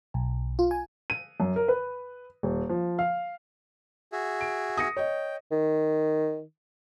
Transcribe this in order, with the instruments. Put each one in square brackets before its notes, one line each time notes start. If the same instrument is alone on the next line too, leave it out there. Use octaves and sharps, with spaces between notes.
[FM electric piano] B1
F4
G#5
[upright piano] D#7
F#2
A#4
B4
D#1
F3
F5
[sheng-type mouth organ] F#4 G#4 E5
[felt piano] D7
D#6 A#6 C#7
[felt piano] C#5 D#5 [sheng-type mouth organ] G5
[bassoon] D#3